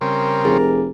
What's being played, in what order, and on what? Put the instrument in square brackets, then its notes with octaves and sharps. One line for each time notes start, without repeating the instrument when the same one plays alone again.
[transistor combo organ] C#3 G3 C4 [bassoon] A#4
[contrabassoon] F1 [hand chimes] G#4